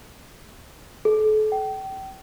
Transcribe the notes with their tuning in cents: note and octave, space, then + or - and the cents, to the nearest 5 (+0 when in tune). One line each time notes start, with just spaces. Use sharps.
A4 -35
G5 -30